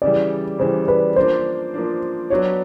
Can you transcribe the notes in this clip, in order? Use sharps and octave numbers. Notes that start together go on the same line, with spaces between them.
C#3 E3 G3 D5
C#3 E3 G3 C5
B4
F3 A#3 D4 C5
F3 A#3 D4
F#3 B3 D4 C#5